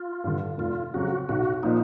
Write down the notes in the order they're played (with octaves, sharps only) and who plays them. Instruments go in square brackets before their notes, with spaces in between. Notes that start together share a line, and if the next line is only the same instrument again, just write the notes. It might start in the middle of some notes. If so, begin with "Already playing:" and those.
Already playing: [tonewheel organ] F4
[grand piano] G2 D3
[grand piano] F1 [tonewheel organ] F4
[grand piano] F2 C#3 F#3 [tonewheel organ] F#4
[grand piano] B1 [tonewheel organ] F#4
[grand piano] A#2 F3 A#3 [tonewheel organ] D#4